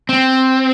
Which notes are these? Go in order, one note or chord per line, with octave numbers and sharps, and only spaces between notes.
C4